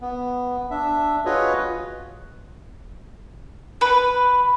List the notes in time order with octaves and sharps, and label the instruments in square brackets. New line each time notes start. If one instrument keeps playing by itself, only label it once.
[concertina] B3
D4 E5
F4 F#4 G#4 B4 C#5 D#5
[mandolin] B4